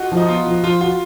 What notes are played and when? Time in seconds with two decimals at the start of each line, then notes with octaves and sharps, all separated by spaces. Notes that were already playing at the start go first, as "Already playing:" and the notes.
Already playing: D#4 F4 F#4
0.12 F3 D#4
0.28 B3 F4
0.47 F3
0.63 F3 F4
0.81 F4 F#4